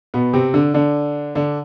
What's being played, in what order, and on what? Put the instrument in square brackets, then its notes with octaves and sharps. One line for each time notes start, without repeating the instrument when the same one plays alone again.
[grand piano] B2 B3
C3 C4
D3 D4
D3 D4
D3 D4